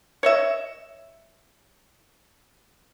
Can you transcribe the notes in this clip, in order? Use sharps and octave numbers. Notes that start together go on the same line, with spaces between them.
C#5 D#5 E5